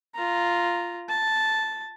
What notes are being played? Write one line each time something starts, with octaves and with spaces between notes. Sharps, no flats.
F4 A#5
A5